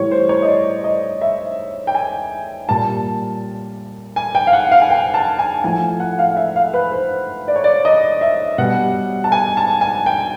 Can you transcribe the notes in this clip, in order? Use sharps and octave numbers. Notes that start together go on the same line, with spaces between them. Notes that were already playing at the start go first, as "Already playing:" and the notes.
Already playing: A2 E3 G3 C#5
C5
C#5
D#5
D5
D#5
E5
G5
G#5
A#2 G3 A5
G#5
G5
F5
F#5
F5
G#5
G5
A5
G#5
A2 F3 A3 G#5
F#5
F5
F5
E5
F5
B4
C5
D5
C#5
D5
D#5
E5
B2 G3 F#5
A5
G#5
A5
G#5
G5